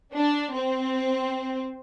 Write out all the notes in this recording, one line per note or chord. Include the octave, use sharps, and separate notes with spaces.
D4
C4